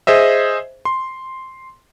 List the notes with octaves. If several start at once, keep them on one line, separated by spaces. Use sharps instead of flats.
G#4 C5 D#5 E5
C6